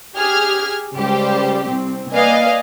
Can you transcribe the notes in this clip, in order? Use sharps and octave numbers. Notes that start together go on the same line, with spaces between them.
G4 G#4 F6 G#6
C#2 G3 G4 C5
C2 C4
A#3 B4 D5 D#5 F5 G#5